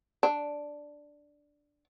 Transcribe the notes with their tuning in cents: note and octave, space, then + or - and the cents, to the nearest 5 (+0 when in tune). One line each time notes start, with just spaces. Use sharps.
D4 +0